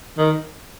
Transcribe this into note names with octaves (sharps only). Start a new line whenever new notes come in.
D#3